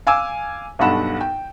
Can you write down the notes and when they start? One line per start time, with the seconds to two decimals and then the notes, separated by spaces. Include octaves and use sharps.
0.07 F5 G#5 D6 E6
0.79 B1 G2 A4 F#5 B5 E7
1.21 G5